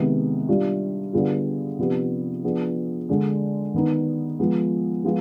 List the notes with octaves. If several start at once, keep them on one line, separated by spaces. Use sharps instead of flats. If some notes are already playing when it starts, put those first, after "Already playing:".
Already playing: C3 D#3 G#3 B3
G3 D4 F4
D3 G3 B3 F4 G#4
C3 F3 B3 D4 G4
F3 B3 D4 G#4
D3 G#3 D4
D#3 B3 D#4
F3 G#3 B3
F3 G#3 B3 F4 G#4